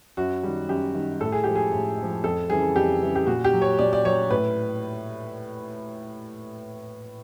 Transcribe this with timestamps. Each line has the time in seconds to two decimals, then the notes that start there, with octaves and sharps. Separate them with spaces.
0.17 F#2 F#4
0.44 D#3 G3
0.69 F#2 G4
0.95 D#3 G3
1.21 A2 A4
1.32 G#4
1.44 F3 G#3 G4
1.55 G#4
1.72 A2
1.98 F3 G#3
2.24 F2 A4
2.49 C#3 E3 G3 G#4
2.75 F2 G4
3.01 C#3 E3 G3
3.15 G4
3.27 A#2 F#4
3.44 G4
3.53 F#3
3.62 C#5
3.79 A#2 D5
3.93 D5
4.05 F#3 C#5
4.30 A2 B4